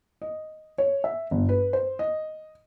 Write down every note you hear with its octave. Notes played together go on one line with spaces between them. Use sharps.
D#5
C#5
E5
G1
B4
C5
D#5